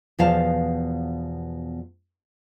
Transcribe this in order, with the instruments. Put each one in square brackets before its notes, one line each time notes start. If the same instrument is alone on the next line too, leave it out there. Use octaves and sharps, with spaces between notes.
[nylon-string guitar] E2 B2 F3 D5 F5 A5